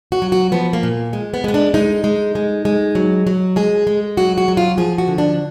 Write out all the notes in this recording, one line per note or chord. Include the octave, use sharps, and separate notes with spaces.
F#4
F#3
F#4
F3 B3
A#3
A#2
G#3
B3
G#3 B3
D4
G#3 D#4
G#3
G#3
G#3
F#3
F#3
G#3 G#4
G#3
F#3 F#4
F#4
F#3
F4
F3 G#4
F#4
D3
D4